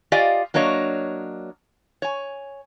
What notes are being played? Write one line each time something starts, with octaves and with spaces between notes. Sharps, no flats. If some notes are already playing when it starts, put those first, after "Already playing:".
F4 G4 D5 D#5 F5 G#5
F#3 A#3 D4 C#5 D#5
C#5 G#5